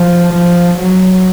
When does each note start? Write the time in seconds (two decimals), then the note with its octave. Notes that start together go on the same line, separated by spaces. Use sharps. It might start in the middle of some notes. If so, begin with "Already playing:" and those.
Already playing: F3
0.35 F3
0.80 F#3